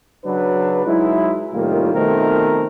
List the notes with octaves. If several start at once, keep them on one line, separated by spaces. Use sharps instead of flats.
C#3 F#3 D4 B4
F#3 G#3 D#4 E4
C2 A2 D#3 G3 A#3 F4
B2 D#3 F3 A3 C4 A#4